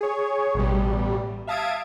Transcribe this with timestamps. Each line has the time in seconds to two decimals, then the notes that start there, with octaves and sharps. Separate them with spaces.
0.01 G#4 C#5
0.55 A1 B2 G3
1.47 E5 F5 A5 D#6 G#6 D7